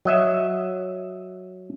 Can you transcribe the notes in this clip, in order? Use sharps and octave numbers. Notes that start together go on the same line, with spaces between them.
F#3 D#5 E5